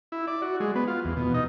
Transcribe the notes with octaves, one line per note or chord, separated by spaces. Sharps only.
E4
D5
F#4
G#3
B3
F4
E2
B2
D#4